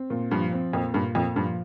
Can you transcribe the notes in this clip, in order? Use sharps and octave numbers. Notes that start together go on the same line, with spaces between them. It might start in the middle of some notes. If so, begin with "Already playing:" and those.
Already playing: C4
A#2
G2 F3
C4
F2 A#2
G2 A#2
F2 A#2
G2 F3